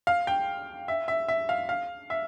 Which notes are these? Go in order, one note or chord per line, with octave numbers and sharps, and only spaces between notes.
F5
G5
E5
E5
E5
F5
F5
E5